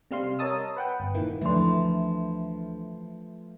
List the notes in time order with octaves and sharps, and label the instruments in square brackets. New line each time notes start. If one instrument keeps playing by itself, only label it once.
[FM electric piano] C3 G3 F5 C6
A#4 C#5 D#5 A5 D#6 E6
B4 F#5 G5
G1
A#2 D#3 E3 A#3
[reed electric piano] D2 E3 D4 [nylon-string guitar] F3 [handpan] A3 B4 [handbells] E5 C6